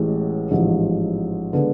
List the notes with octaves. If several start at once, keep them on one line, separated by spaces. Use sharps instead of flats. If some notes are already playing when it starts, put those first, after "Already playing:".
Already playing: A1 A2 E3 G#3
A1 G#2 F3
D3 G#3 B3